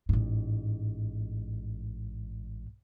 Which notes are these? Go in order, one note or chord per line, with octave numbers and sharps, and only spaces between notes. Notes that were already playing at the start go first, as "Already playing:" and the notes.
A1 G#2